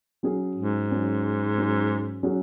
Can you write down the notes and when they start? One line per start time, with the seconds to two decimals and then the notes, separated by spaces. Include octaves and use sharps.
0.23 F#3 C#4 G#4
0.56 G#2
0.90 F#3 C#4 G#4
1.57 F#3 C#4 G#4
2.23 F#3 C#4 G#4